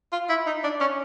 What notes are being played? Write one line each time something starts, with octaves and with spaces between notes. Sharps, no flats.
F4
E4
D#4
D4
C#4